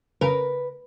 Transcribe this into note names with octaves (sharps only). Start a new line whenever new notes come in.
C#3 A#4 B4